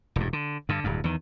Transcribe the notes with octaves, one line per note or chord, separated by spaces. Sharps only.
E1 G2
D3
G2 D3
D1 G2
E2 D#3